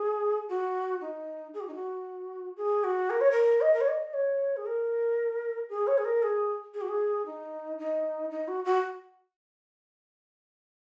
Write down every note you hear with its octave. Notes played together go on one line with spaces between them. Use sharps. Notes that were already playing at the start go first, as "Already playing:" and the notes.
Already playing: G#4
F#4
D#4
G#4
F#4
D#4
F#4
G#4
F#4
A#4
C#5
A#4
D#5
A#4
C#5
D#5
C#5
G#4
A#4
G#4
C#5
G#4
A#4
G#4
G#4
F#4
G#4
D#4
D#4
D#4
F#4
F#4